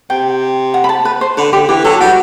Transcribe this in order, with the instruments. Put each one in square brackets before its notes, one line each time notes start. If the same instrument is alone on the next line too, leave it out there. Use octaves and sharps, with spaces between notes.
[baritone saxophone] C3 [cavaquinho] G5
[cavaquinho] F#5
B5
A5
B4
C5
[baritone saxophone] D3 [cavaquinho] B4
[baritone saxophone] D3 [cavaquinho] G4
[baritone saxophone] E3 [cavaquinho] G4
[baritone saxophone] F#3 [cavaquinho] A4
[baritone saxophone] G3 [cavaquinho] F#4